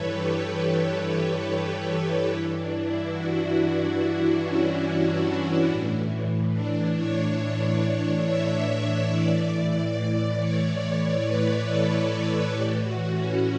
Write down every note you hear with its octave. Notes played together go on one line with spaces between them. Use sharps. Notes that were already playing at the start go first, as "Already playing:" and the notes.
Already playing: G2 E3 A4 B4 C#5
G4
G2 E3 E4
D4
E4
F#4
D4
C#4
A2 E3
D4
C#5
E5
A2 E3 D5
D5
C#5
C#5
B4
A4
A4
A2 E3 G4
F#4
C#4